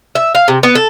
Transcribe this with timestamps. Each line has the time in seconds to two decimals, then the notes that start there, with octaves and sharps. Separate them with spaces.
0.15 E5
0.35 F5
0.48 C3
0.63 B3
0.75 A4